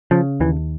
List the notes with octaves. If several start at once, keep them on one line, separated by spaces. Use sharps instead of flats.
C#3 F3
D#2 E3